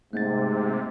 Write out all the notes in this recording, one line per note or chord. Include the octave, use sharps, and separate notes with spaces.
G#2 C3 A3 A#3 A6